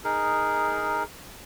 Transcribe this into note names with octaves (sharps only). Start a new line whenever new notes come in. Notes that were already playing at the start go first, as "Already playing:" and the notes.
D#4 G#4 A#4